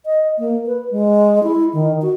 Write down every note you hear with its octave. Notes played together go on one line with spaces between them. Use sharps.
D#5
A#3
B4
G#3
E4
D#3
F#4